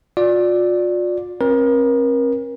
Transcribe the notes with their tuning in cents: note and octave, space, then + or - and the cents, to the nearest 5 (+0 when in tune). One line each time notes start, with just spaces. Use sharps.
F4 +40 D5 +0
C4 +45 A#4 +30